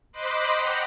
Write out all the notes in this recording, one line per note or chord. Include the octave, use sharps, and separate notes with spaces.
C5 D#5 B5 C6 D6 F#6
F#5 G5 A#5